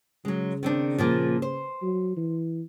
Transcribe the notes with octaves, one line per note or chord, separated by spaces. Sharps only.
C#3 F#3 G#3
D#3 C4 D4
A#2 F3 A#3
C5
F#3
E3